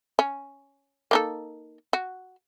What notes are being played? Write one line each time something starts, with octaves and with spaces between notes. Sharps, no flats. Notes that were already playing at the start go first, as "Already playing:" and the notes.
C#4
A#3 D#4 A4
F#4